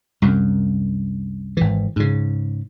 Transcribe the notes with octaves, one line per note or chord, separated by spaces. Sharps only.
C2 F#2
G#1 E3
G#2 C#3